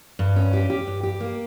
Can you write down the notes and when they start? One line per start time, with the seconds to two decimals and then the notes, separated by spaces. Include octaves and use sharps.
0.19 G2
0.36 C#4
0.53 G4
0.70 G4
0.87 G2
1.03 G4
1.20 A#3